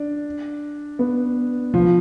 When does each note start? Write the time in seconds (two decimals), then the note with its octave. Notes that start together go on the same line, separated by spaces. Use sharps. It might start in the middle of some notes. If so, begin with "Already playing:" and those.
Already playing: D4
0.99 B3
1.74 F3